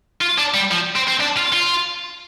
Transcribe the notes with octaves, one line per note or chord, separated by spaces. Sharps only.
F4
D4
G3
F3
C4
C4
D4
F4
F4